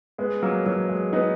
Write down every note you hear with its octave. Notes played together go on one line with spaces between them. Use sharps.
G#3 B3
F#3 A#3
F#3
G#3
B3 D#4